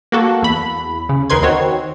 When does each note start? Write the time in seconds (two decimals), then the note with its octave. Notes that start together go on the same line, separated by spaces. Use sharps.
0.12 A#3 F#4 A4
0.42 E2 B5
1.09 C#3
1.30 D#2 D#4 A#4 B4 C6 G#6
1.43 D#3 C4 F#4 C#5